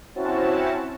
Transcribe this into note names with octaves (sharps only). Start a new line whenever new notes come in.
C4 C#4 E4 F#4 A5